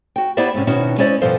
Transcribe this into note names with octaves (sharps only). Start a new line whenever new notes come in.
F#4 G5
B3 E4 G4 C5 D5 E5
G#2 C3 C#4
B2 D#3 C#4 D#4 E4 F#4
G#3 C#4 E4 C5 D5
G2 B2 F3 A4 C5